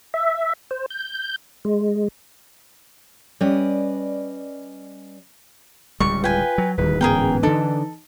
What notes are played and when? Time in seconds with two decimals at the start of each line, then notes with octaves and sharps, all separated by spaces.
0.14 E5
0.71 C5
0.90 G6
1.65 G#3
3.41 G3 C#4 B4 D5 D#5
6.00 D1 C#2 G3 C#6
6.24 F4 B4 G5 G#5
6.58 F#3
6.78 D1 D#2 D#3 G3 B4
7.01 G#2 E3 B3 C#4 G#4 A#4 G5
7.43 D3 D4 D#4 A4